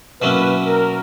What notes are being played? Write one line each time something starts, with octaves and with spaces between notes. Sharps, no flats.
B2 F#3 A#3 C#4 E4 B4
A#4